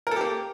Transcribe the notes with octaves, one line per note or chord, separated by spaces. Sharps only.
A#3 G4 A4 A#4